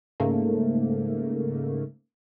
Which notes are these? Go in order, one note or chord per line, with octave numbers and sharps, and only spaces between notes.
G#2 C#3 A3 A#3